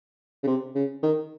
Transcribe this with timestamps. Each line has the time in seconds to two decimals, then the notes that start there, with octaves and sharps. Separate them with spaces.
0.43 C#3
0.47 C3
0.75 C#3
1.03 D#3